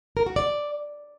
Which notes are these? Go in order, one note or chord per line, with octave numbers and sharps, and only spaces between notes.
A#4
F#4
D5